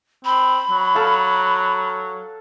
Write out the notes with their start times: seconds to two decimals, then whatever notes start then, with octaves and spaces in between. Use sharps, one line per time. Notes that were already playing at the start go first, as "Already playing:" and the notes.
0.25 C4 B5
0.70 F#3
0.95 A4 F5